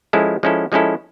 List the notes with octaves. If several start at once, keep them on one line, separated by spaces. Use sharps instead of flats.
F3 G#3 C#4 E4 A4
F3 G#3 C#4 E4 A4
F3 G#3 C#4 E4 A4